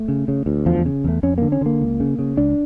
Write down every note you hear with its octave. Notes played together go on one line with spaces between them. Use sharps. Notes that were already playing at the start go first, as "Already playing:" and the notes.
Already playing: A3
C#3
C#3
D2
E2 F3
C#3
E2 A3
F2 C#4
D3 A#3
C#4
D3 A#3
C#2
C#3
C#3
C#2 D4